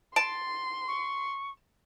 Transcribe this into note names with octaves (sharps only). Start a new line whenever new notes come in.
A5 C6 D7
C#6